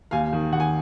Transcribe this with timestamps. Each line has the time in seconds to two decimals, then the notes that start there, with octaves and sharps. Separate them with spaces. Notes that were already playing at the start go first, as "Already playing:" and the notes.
0.11 D#2 F5 G#5
0.33 D#3
0.52 D#2 F#5
0.60 G#5